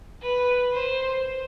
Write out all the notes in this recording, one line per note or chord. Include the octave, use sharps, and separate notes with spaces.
B4
C5